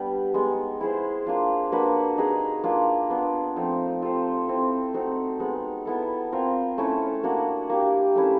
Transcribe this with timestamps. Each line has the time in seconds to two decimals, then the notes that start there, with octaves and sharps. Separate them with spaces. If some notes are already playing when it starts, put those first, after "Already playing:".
Already playing: G3 B3 D4 G4
0.34 G#3 B3 D#4
0.81 E4 G#4 C5
1.26 A#3 D4 F4
1.72 A#3 D4 F#4 B4
2.18 D#4 G#4 B4 D#5
2.64 A#3 D4 F4
3.10 B3 D4 F4
3.56 F3 A3 C4 D#4
4.02 C4 F4 A4 C5
4.48 C4 E4 A4
4.94 A3 C4 D#4 F#4
5.40 G#3 B3 D#4
5.85 B3 E4 A4
6.32 C4 F4 A#4
6.78 A3 C#4 E4 A4
7.23 A#3 D4 F#4
7.70 A#3 D4 G4
8.15 A3 C#4 E4